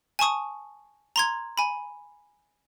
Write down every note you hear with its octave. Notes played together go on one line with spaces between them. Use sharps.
G#5 A5 C#6 D#6
A#5 C6 G#6
G#5 B5